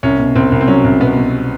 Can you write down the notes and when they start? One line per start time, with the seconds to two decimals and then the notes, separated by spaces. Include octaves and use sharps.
0.03 C2 C#4
0.19 B2
0.35 C2 C4
0.52 C2
0.61 C4
0.68 F#3 C#4
0.84 C2
1.01 B2 B3
1.18 B2